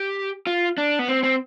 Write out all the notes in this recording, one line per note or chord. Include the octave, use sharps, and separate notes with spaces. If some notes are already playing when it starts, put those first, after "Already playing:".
Already playing: G4
F4
D4
B3
C4
C4